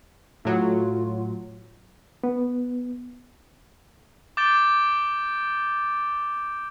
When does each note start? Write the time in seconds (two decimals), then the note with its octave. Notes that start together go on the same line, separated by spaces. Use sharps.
0.45 A2 F#3 F4
2.24 B3
4.37 D6 G6 A6 D7 G7